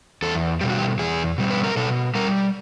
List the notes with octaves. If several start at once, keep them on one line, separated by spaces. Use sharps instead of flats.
E2 A4
B2 G3 G4
F#4
G4
E2 G#4
B2 G3
B4
A#4
B2 A4
G3 A#4